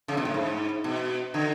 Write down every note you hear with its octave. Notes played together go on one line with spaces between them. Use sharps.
C#3
B2
A2
G#2
B2
D3